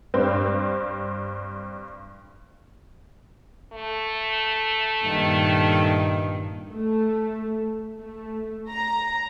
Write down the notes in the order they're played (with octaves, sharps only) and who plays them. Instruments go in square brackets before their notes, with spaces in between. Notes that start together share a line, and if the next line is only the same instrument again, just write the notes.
[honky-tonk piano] G2 C4
[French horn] A3
[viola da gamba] G2 A#2 D#3
[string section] A3
A3
A#5